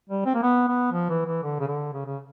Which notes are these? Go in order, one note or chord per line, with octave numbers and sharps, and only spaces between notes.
G3
C4
A#3
B3
B3
F3
E3
E3
D3
C#3
D3
C#3
C#3